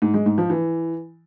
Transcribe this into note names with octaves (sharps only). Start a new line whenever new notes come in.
G#2
G#3
G#2
F3
E3